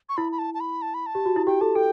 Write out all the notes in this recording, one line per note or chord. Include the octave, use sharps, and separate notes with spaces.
C#6
E4 B5
B5
A5
A5
B5
A5
B5
A5
G4
F#4
E4
G4 G5
A4 A5
A4 G5